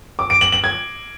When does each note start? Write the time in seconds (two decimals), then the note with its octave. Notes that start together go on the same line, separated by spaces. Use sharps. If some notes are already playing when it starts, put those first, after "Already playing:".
0.19 D6
0.30 D7
0.41 F#7
0.52 F#7
0.64 G#6